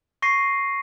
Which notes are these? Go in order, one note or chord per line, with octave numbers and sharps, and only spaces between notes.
C#6 A#6 C7 D#7